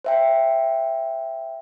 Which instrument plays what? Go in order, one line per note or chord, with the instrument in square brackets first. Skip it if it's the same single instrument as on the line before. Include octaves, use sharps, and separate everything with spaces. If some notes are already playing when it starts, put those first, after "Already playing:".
[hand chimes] C5 E5 G5